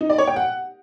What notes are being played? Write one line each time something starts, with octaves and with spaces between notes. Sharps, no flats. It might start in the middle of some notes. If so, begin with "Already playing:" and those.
D#4
D5
C#5
G5
F#5